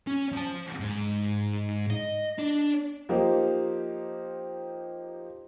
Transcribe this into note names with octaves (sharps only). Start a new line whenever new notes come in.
C#4
F3 A5
G#2
D#5
D4
F3 A#3 D#4 G4 C5